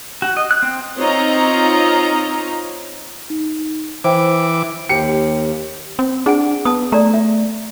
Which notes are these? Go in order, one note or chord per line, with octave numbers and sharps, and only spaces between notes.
F#4
D#5
F#6
C4
C4 D#4 F4 C#5 D#5 A#5
D#4
E3 C5 G5 D6
D#2 G4 C#7
C4
D4 G#4 F#5 G#5
B3 A5 D#6
A3 D5 A#5
E5